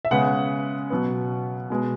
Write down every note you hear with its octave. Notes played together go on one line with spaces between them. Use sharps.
E5
C#3 G#3 B3 F#5
B2 F#3 B3
B2 G#3 B3